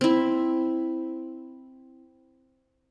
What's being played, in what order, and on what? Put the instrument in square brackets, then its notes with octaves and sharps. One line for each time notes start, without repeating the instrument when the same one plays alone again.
[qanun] C4 E4